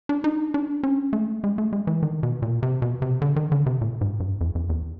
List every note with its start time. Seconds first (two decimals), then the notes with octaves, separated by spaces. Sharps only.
0.09 D4
0.24 D#4
0.54 D4
0.83 C#4
1.13 A3
1.44 G#3
1.58 A3
1.73 G#3
1.87 E3
2.03 D#3
2.23 B2
2.42 A#2
2.63 C3
2.82 B2
3.02 C3
3.22 D3
3.36 D#3
3.52 D3
3.66 C3
3.81 A#2
4.01 G#2
4.20 G2
4.41 F2
4.55 F2
4.70 E2